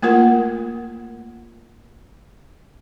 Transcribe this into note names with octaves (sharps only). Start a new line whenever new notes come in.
A3 A#3 F4 A#4 F#5